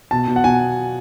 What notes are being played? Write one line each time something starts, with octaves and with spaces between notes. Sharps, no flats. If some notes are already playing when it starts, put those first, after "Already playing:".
B2 A5
B2
F#5
B2 G#5